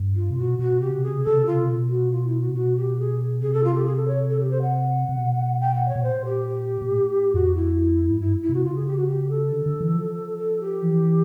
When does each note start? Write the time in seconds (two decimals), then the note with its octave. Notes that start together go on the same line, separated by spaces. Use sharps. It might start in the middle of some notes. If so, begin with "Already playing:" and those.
Already playing: G2
0.15 F4
0.30 C3
0.37 B2 F#4
0.59 B2 F#4
0.80 C3 G4
0.89 C#3
0.98 C3
1.03 G#4
1.08 C#3
1.18 C3
1.24 C#3 A4
1.36 C3
1.45 C#3 F4
1.55 C3
1.68 B2
1.89 F#4
2.12 F4
2.26 E4
2.40 F#4
2.48 C3
2.54 B2 F#4
2.77 G4
2.98 G#4
3.42 C3 G#4
3.53 A4
3.64 F4
3.75 G4
3.85 G#4
3.96 A4
4.07 C#5
4.29 A4
4.40 G4
4.51 C5
4.62 F#5
5.09 C3
5.16 B2
5.60 G5
5.74 F#5
5.88 C#5
5.96 B2
6.03 A#2 C5
6.25 G4
6.82 A#2
6.90 A2
7.33 F2 F#4
7.55 E4
8.10 G#2
8.21 G2 E4
8.42 E4
8.49 C3 F#4
8.64 C#3 F4
8.75 G#4
8.86 G4
8.97 F#4
9.08 G4
9.29 A4
9.51 D3
9.66 D3
9.81 E3
9.95 F3
10.38 A4
10.60 G4
10.82 E3